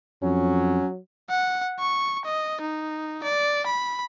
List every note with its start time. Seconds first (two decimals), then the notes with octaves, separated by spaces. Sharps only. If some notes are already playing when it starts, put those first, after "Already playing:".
0.23 F2 F#3 C#4
1.30 F#5
1.79 C#6
2.25 D#5
2.61 D#4
3.23 D5
3.66 B5